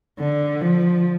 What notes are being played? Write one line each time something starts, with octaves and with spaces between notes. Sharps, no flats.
D3
F3